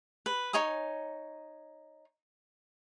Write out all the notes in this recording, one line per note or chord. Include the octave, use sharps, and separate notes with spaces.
B4
D#4 C#5 G#5 D#6